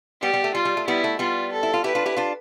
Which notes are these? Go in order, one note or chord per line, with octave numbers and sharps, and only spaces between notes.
G3 B3 G4
G3 B3
A3
G3 F4
G3
A3
G3 B3 E4
A3
G3 B3 F4
A4
E4
F4
E4 G4 B4
D4 F4
E4 G4
D4 F4